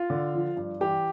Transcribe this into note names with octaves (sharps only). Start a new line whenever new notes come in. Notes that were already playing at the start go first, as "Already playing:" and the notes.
Already playing: F4
D3
F3
G2
E3 G4